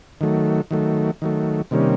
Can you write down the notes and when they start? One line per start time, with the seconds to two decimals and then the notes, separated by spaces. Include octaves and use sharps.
0.21 D#3 F#3 A3
0.71 D#3 F#3 A3
1.22 D#3 F#3 A3
1.71 C3 D#3 G3 A#3 C#4